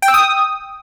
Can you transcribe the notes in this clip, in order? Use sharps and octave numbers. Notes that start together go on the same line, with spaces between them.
G5
E6
D#6